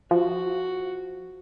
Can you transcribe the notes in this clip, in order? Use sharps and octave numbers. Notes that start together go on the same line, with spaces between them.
F3 F#4